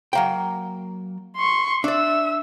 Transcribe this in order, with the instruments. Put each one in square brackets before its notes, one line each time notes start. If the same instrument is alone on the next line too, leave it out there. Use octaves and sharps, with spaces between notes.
[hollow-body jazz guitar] F#3 A#3 G5
[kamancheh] C6 C#6
[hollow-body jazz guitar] D4 D5 [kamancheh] E5 E6